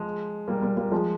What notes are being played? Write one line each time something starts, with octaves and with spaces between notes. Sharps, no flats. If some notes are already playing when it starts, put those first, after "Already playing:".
Already playing: F3 G#3
G3 A#3
G3 A#3
G3 A#3
F3 G#3